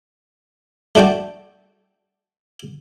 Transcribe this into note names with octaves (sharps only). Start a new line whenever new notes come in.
A3 D4 F#4 G5 A5